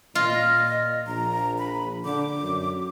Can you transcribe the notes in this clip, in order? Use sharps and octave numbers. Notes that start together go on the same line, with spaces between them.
A#2 F4 D#5
A#1 A#5
B5
D3 D6
F#2